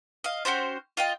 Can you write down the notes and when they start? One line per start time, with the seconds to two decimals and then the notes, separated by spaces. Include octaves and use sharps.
0.24 D#5 F5
0.45 C#4 F#4 G4 C5
0.97 F4 D#5 G5